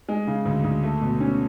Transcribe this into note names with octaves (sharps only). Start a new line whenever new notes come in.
G#3
C#3
D2
D2
A3
B2
C#4